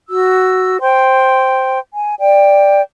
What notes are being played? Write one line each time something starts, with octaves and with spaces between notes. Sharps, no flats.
F#4 E6
C5 G5 C6
G#5
D5 G5